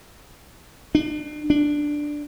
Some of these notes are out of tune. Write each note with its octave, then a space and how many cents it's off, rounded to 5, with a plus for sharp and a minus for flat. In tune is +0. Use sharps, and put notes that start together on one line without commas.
D4 +35
D4 +5